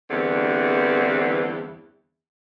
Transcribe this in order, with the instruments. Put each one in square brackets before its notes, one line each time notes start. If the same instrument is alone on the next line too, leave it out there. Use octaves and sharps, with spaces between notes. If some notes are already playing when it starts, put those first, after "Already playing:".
[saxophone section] E2 G2 D3 E3 C4